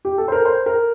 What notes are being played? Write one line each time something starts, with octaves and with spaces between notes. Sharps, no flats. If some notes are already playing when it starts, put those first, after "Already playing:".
G4
A4
C5
A#4
C5
A#4